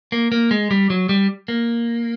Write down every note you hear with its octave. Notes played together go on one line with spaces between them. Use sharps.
A#3
A#3
G#3
G3
F#3
G3
A#3